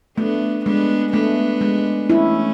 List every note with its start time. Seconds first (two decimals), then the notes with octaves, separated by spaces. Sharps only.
0.18 A3 B3 D4
0.65 G#3 B3 D4
1.13 A3 B3 D4
1.61 G#3
2.09 A3 C#4 E4